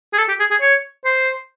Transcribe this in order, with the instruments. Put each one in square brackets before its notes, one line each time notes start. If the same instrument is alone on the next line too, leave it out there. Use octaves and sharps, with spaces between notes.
[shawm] G#4
A4
G4
G#4
G#4
C#5
C5